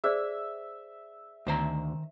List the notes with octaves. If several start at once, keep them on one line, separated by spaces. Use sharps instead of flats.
G#4 C5 D5 E5
D2 D#3 C5 A#5